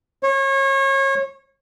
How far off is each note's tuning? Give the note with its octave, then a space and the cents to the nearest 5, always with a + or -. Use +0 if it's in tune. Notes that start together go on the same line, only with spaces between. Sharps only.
C#5 -30